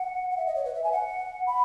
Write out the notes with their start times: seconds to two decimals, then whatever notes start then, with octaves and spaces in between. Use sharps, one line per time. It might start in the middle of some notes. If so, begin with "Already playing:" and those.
Already playing: F#5
0.30 F#5
0.37 E5
0.46 D#5
0.55 C#5
0.65 B4
0.74 E5
0.84 G#5
0.92 F#5
1.47 B5